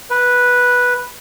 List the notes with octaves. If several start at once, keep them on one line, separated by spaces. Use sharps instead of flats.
B4